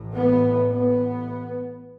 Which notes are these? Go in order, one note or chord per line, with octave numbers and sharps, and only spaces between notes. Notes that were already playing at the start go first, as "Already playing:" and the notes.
Already playing: A1 A2
B3
B3